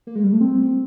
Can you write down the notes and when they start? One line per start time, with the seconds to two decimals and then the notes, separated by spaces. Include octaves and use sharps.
0.07 A#3
0.15 G#3
0.24 G3
0.32 A3
0.41 C4